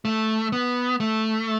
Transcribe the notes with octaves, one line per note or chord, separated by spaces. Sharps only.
A3
B3
A3